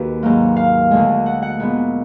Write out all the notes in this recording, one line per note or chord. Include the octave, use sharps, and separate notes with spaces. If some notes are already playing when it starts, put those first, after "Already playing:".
Already playing: D#2 D#3 F#4 G#4 B4
G#2 F#3 A#3
F5
D2 D3 G#3
F#5
F#5
A#2 G#3 B3